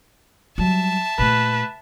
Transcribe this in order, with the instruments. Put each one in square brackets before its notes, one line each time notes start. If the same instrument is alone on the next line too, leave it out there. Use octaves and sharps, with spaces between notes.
[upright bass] F#3 G3 [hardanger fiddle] E5 A5
[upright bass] A#2 A3 [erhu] B4